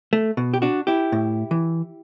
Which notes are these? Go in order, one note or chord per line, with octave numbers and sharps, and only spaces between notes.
A3
B2
G4
D4 F#4
E4 G4
A2
E3